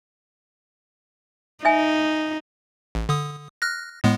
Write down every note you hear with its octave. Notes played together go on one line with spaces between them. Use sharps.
D#4 E5 G#5
A1
D3 D#6
F6 F#6 A#6
A2 G#3 B3